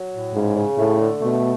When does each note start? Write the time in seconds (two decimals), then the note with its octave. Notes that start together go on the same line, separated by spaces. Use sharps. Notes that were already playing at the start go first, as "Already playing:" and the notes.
Already playing: F#3
0.12 A2
0.34 G#2 C#3
0.56 C#3
0.77 A2 A3
1.00 D3
1.21 B2 A3